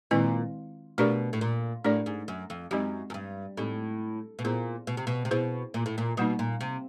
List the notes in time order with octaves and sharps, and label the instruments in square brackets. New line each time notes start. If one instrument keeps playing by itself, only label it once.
[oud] A#2 [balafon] D#3 G#3 C4 E4
[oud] B2 [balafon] A3 D4 G4 A#4 D5
[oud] A2
A#2
[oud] A2 [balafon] A3 D4 G4 A#4 D5
[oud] G#2
F#2
F2
[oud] F#2 [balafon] G#3 C4 D#4 G4
[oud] F#2
G2
[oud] A2 [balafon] G#3 C4 D#4 G4
[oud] B2
[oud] A#2 [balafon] B3 E4 G#4 C5
[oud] B2
C3
B2
C3
[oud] B2 [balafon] B3 E4 G#4 C5
[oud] A#2
A2
A#2
[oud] B2 [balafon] G3 A#3 D#4
[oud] A#2
C3